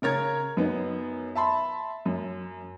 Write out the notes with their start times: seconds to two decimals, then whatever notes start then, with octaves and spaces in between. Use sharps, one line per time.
0.02 C#3 A#4 C#5 G#6
0.57 F#2 B3 D#4
1.35 E5 A5 B5 C6
2.06 F#2